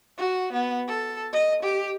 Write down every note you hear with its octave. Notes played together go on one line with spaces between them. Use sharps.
F#4
B3
A4
D#5
G4